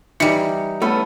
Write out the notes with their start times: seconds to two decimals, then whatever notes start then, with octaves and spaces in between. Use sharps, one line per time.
0.20 E3 G3 D#4 C#7
0.82 A3 B3 C#4 E4 A4